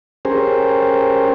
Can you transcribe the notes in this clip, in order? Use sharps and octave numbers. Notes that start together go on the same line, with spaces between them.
C#4 G4 G#4 A#4 C5